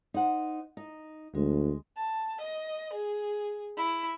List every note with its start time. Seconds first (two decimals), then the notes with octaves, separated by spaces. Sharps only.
0.14 D#4 C5 F#5
0.77 D#4
1.35 D2 G#3
1.96 A5
2.38 D#5
2.92 G#4
3.76 E4